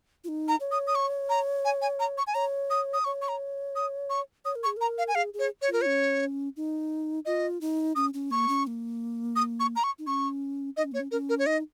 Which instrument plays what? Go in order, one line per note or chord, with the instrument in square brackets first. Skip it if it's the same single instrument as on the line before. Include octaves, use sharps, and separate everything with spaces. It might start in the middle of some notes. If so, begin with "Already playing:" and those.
[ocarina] F4
D#4
[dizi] A#5
[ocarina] C#5
[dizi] D#6
D#6
C#6
A#5
G#5
G#5
A#5
C#6
G#5
[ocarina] C#5 [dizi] A#5
[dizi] D#6
D#6
[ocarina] C#5 [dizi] C#6
[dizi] C#6
A#5
D#6
C#6
[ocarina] C#5 [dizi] D#6
[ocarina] A#4
[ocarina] G#4 [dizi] C#6
[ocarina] A#4 [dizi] A#5
[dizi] F5
G#5
[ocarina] G#4 [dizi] F5
[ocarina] G#4
[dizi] C#5
C#5
[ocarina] F4 [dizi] A#4
[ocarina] C#4 [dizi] C#5
[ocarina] D#4
[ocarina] F4 [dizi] D#5
[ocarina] D#4
[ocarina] C#4 [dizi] D#6
[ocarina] C#4
[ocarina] A#3 [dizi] C#6
[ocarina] C#4
A#3
[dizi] D#6
C#6
A#5
C#6
[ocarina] D#4
[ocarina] C#4 [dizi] C#6
[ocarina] D#4 [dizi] D#5
[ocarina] C#4
[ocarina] A#3 [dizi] C#5
[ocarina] C#4
[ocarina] C#4 [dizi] A#4
[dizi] A#4
C#5
[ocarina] D#4 [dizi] D#5